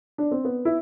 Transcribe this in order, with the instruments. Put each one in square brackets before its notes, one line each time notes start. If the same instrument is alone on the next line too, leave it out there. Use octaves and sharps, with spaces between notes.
[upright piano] D4
C4
B3
E4